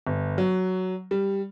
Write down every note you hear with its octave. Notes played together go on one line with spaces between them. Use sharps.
G1
F#3
G3